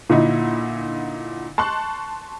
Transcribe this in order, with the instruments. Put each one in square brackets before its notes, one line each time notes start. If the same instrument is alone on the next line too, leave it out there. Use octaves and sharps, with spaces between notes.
[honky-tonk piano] A#2 D3 D#4 E4
A5 C6 C#6 F#6